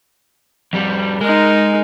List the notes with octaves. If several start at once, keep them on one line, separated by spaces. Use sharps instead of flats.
F2 G3
G#3 D#4 A#4